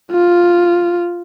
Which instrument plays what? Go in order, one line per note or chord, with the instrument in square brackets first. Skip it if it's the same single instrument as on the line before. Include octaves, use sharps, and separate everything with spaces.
[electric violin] F4